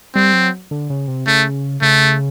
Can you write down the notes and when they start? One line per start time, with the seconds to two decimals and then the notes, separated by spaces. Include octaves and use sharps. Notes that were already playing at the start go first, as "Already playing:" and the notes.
0.15 G3 C4
0.33 F#3
0.71 D3
0.90 C#3
1.08 C3
1.27 C#3 A3
1.82 C#3 A3